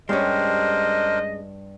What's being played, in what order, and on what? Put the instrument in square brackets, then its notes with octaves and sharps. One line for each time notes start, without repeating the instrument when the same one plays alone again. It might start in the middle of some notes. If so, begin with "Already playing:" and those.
[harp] G2 [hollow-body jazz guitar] G#3 C#4 [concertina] D4 A#4 C5 [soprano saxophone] D#5